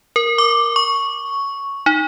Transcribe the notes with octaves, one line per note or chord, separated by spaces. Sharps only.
A#4
D6
C#6
D#4